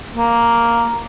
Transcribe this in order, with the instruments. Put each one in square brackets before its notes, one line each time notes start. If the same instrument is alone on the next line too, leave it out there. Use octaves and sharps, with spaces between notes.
[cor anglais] A#3